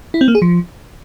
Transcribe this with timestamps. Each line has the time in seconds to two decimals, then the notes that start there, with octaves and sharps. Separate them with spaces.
0.14 E4
0.21 C4
0.28 A#3
0.35 G#4
0.42 F3